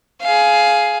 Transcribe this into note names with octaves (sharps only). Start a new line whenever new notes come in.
G#4 F5